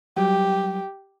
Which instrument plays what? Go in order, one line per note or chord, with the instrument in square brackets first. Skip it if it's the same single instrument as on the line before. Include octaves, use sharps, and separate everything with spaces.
[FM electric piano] F#3 G3 [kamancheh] G4